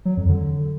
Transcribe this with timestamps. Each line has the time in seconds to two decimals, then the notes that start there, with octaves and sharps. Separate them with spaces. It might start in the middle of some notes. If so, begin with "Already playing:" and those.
0.05 F#3
0.17 F2
0.29 D3